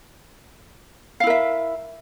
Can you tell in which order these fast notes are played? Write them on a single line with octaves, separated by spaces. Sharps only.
F5 E4 A#4 E5